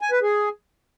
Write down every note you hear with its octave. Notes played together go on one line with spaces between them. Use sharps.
G#5
B4
G#4